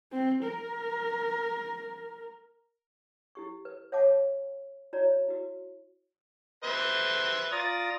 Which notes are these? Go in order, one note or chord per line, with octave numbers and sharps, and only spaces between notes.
C4
A#4
E4 G4 C#6
B4
C#5 E5 F#5 A5 D6
E4 F#4 C#5 D5 A#5
E4 F#4
B4 C5 E5
F4 D5 A#5 D#6